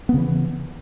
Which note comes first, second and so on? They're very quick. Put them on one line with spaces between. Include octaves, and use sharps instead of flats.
B3 C#3 E3